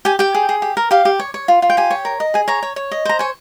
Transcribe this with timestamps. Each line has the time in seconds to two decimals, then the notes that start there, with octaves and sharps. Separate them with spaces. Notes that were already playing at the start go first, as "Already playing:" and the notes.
0.05 G4 G#5
0.19 G4 G5
0.34 G#4
0.49 G#4
0.62 G4
0.77 A#4
0.91 G4 F5
1.05 G4
1.20 C#5
1.34 C#5
1.48 F4
1.62 F4
1.70 G5
1.77 G4 G#5
1.91 C#5
2.05 A#4
2.20 D#5
2.34 G#4 G#5
2.48 C#5 A#5
2.63 C#5
2.76 C#5
2.91 D#5
3.05 C5 A#5
3.19 C#5 G#5